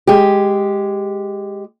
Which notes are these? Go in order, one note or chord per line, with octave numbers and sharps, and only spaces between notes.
G#3 G4